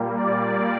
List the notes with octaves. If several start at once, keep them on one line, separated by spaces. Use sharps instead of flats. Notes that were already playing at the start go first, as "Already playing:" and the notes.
Already playing: A#2 G3 A#3
D5